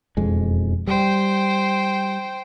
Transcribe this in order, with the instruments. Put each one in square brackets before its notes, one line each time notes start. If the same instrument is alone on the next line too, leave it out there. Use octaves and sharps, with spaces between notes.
[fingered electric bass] E1 F2 G#3
[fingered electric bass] G3 [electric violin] C5 G5